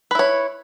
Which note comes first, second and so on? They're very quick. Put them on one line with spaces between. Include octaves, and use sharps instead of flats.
B4 E4 C#5